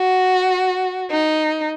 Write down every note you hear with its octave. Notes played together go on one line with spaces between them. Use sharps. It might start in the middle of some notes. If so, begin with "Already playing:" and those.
Already playing: F#4
D#4